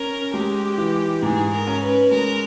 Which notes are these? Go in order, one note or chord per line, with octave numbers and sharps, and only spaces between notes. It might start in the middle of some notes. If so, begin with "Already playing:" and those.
Already playing: C#4 A#4
G#3 G4
E3
G#2 G#4
A#4
C#4
B4
G#3 A#4